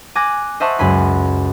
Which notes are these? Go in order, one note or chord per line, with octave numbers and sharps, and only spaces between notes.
G#5 D6 F#6 G#6 A#6
C5 D#5 E5 F#5 A5 C#6
C#2 F#2 G#5 B5 C6